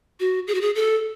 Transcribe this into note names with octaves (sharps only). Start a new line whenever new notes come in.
F#4
G#4
F#4
G#4
A4